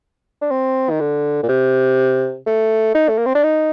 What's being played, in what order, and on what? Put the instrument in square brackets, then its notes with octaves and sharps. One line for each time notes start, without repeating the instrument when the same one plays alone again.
[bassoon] D4
C4
D#3
D3
A#2
C3
A3
D#4
A3
A#3
C4
D4
D#4